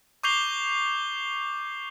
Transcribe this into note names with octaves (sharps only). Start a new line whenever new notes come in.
C#6 D6 G6 C7 F7 G7